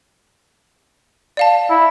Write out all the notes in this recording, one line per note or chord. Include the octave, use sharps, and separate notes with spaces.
D5 F5 A5
E4